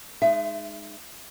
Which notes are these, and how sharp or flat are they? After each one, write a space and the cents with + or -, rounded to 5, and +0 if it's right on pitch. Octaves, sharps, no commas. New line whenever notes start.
G#3 +0 D#4 -20 E5 +30